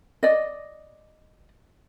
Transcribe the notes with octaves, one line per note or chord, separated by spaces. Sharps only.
D5 D#5